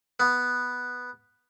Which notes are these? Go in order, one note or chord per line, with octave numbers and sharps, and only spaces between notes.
B3